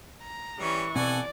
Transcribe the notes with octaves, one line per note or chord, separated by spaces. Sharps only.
A#5
E3 G3 C#4 C#6
B2 C4 A4 D5 F#5 G#5